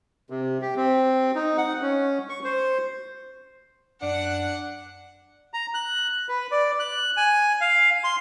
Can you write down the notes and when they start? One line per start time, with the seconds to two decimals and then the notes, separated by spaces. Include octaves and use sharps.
0.30 C3
0.62 G4
0.76 C4
1.35 D#4
1.58 F#5
1.82 C#4
2.29 C#6
2.45 C5
4.02 F#2 D4 F#5
5.54 A#5
5.74 F#6
6.29 B4
6.51 D5
6.79 F#6
7.17 G#5
7.61 F5
8.04 C6